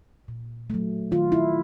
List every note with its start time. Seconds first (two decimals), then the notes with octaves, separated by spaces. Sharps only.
0.28 A#2
0.70 F#3 A3
1.11 D#3 F4
1.32 E4